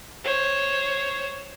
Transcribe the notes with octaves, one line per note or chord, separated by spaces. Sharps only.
C5 C#5